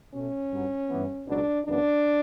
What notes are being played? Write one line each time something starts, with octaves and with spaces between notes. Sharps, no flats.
B2 A3 C#4
G2 F#3 B3
G2 E3 B3
C#2 B2 F#3 D4
F#2 C#3 E3 B3 D4